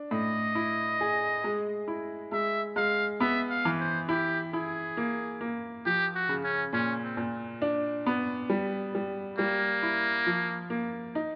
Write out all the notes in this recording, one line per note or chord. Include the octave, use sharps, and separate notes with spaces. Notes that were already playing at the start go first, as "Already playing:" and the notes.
Already playing: D4
A2 D#5
E4
G#4
G#3
E4
G#3 E5
G#3 F5
B3 E5
F5
E3
C5
E4 G4
E4 G#4
A#3
A#3
F3 G4
F#4
C#3
C#4
A#2 C#4
C4
A#2
D4
B3
G3
G3
G3 A#3
E4
F3
A#3
D#4